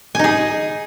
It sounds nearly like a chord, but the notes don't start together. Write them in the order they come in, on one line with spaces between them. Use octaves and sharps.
G#5 D#4 G#4